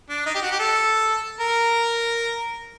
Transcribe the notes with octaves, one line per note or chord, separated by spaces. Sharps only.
D4
D#4
G4
F#4
G4
A4
A#4